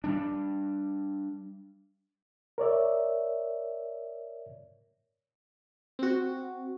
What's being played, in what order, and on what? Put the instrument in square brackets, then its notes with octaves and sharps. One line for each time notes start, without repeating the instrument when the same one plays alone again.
[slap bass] G3 D4
[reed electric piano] A#4 C#5 D5 E5
[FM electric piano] C4 F#4